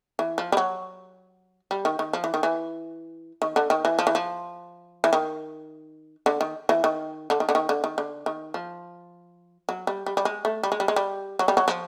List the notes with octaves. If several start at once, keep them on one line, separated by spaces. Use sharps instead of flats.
E3
F3
G3
F#3
G3
D#3
D#3
F3
E3
D#3
E3
D#3
D3
D#3
E3
F3
E3
F3
E3
D#3
D3
D#3
E3
D#3
D3
D#3
D3
D#3
D3
D#3
D3
D#3
F3
F#3
G3
G3
G3
G#3
A3
G3
G#3
G3
G#3
G3
F#3
G3
F#3
F3